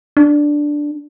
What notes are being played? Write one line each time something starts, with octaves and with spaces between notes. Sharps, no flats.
D4